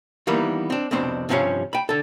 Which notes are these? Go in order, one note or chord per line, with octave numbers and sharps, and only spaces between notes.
D#3 E3 G3 A#3 B3
C4 D4
C2 F2 B2 C4 D4 C5
G2 C3 F3 C#4 C#5 F5
G5 B5
D3 A4